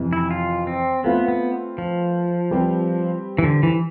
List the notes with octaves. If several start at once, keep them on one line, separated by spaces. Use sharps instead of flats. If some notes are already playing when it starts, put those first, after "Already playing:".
Already playing: F2 C3 E3
E4
F4
C4
A3 B3 C4 F4 B4
B3
F3
G3 C4 G4 B4
E3
D3
E3